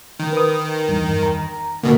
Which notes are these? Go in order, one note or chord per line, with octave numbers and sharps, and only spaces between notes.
D#3
B4 D#6
E2 G2
A#5
D2 B2 A#3